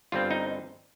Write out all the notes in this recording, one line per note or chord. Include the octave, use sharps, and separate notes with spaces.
G1 G2 G3 C4 F4
D#4